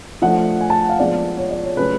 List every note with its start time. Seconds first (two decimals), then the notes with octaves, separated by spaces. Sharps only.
0.22 F3 A3 D4 F#5
0.60 G#5
0.70 A5
0.89 F5
0.99 F3 G#3 B3 D4 D5
1.38 C#5
1.51 D5
1.64 C#5
1.77 C#3 F#3 A3 C#4 B4